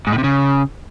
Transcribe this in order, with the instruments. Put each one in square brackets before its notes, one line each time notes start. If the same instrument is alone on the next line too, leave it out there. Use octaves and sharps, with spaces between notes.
[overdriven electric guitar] G#2
A2
C3
C#3